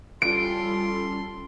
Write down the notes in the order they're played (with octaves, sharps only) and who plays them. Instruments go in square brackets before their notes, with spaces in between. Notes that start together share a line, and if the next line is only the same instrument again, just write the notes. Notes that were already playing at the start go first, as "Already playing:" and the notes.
[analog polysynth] G3 C#4 A4 [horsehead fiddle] F4 [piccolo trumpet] C6 [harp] D7